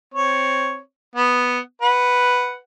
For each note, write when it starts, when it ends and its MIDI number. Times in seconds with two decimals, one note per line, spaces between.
0.14 0.79 60
0.14 0.79 73
1.15 1.59 59
1.82 2.57 71
1.82 2.57 78